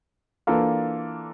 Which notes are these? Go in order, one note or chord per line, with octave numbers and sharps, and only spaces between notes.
E3 A#3 D4 F4 A4